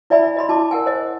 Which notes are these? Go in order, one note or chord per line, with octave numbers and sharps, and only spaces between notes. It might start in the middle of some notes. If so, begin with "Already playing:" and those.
E4 D5 E5 G#5 B5
D#5 B5 C6
E4 A5 C6 D6
A#4 F#5 G#5
C5 D#5